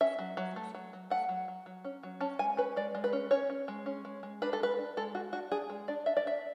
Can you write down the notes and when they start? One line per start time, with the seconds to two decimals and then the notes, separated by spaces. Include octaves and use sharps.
0.01 C#4 E5
0.19 F#3
0.37 F#3
0.56 A3
0.75 F#3
0.93 F#3
1.10 A3 F#5
1.29 F#3
1.48 F#3
1.66 F#3
1.84 C#4
2.03 F#3
2.21 C#4 A5
2.39 G#3 G#5
2.57 C#4 B4
2.76 G#3 D5
2.95 G#3
3.04 B4
3.13 C#4
3.31 C#4 C#5
3.50 C#4
3.68 G#3
3.86 C#4
4.05 G#3
4.23 G#3
4.42 D4 B4
4.53 A4
4.60 G#3 B4
4.78 D4
4.97 G#3 A4
5.15 G#3 F#4
5.33 D4 F#4
5.52 D4 G#4
5.70 G#3
5.88 D4 D5
6.06 D4 E5
6.17 D5
6.25 D4 E5